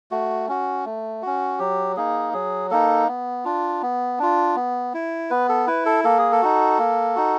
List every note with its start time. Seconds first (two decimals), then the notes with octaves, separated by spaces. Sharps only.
0.11 A3 F#4
0.48 C#4 F#4
0.86 A3
1.22 C#4 F#4
1.59 F#3 G4
1.97 A#3 D#4 G#4
2.33 F#3 G#4
2.71 A#3 D#4 A4
3.08 B3
3.45 D4 F4
3.82 B3
4.19 D4 F4
4.56 B3
4.94 E4
5.30 B3 B4
5.49 A4
5.67 E4 B4
5.86 A4
6.04 A#3 A4
6.18 G#4
6.32 A4
6.42 D#4 F#4
6.79 A#3
7.16 D#4 F#4